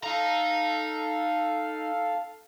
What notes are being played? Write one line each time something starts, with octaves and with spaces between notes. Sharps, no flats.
D#4 A4 F5 A#5